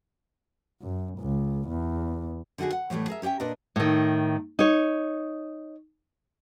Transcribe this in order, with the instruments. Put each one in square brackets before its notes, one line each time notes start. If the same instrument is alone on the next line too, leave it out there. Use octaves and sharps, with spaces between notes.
[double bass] F#2
C#2
E2
[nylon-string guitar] D3 D#4 F4 F#4 G#4
F#5
A2 E3 F3 G3 A3
G#4 A#4 E5
C#4 G4 D5 E5 G5
A#2 D4 A#4 B4 D#5
A2 D#3
D#4 C#5